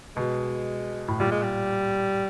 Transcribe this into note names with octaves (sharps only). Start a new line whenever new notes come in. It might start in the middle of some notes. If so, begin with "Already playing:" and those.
B2 G#3
A2
A#2 G3
G#3
G3